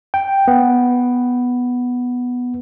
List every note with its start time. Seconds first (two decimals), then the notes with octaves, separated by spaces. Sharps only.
0.14 G5
0.48 B3